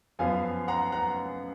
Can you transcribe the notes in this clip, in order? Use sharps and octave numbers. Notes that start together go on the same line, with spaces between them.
F#2 F3 B3 F5 G#5
F#5 A#5
F#5 A#5